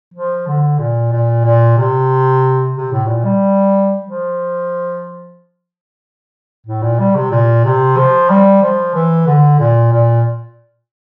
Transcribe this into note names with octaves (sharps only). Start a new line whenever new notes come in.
F3
D3
A#2
A#2
A#2
C3
C3
A2
A#2
G3
F3
A2
A#2
G3
C3
A#2
C3
F3
G3
F3
E3
D3
A#2
A#2